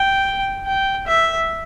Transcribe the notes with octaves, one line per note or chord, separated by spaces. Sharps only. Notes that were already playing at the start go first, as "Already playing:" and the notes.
Already playing: G5
G5
E5